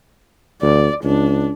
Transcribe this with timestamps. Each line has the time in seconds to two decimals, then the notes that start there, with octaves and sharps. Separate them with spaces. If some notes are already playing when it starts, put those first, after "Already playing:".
0.62 D2 D5
1.04 C#2 D4